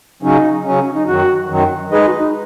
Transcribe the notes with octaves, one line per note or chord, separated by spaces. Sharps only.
C#3 F#3 C#4 D#4
C#3 F#3 C#4
C#4
D#4
F#2 D#3 F#3 F#4
F#2 D#3 F#3
G#3 D#4 G#4 B4 D#5
F#4
D#4